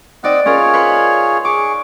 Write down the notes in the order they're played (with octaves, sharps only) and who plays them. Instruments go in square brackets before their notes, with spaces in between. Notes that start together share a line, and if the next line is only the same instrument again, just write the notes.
[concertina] C4 D#5 F#5 [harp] D#4 D5
[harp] C#4 A#4 [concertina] F4 G#4 C#5
[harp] B4 C6 C#6
[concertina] G#4 C#6 [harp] D6